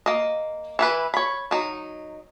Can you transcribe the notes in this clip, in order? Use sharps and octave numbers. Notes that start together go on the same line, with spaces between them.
A#3 D#5
E3 E4 B4
C#5 B5
F#3 D#4